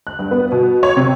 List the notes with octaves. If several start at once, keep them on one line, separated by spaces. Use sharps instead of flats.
F#6
G2
B3
B2
C#5
C3